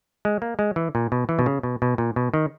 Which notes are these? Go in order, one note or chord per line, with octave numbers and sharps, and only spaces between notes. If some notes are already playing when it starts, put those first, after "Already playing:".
G#3
A#3
G#3
E3
A#2
B2
E3
B2
C#3
B2
B2
A#2
B2
D#3